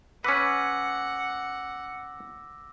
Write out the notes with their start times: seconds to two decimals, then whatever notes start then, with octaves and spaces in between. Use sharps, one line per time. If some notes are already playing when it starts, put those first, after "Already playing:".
0.24 C#4 B4 F#5 D6 E6 A#6